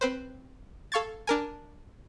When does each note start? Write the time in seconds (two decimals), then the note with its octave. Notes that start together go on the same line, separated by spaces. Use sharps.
0.01 C4 B4 C5
0.92 A4 F5 C#6 G#6 A6
1.27 D4 A#4 G#5